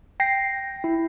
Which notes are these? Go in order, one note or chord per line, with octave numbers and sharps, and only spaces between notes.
G5 A#6 C7
E4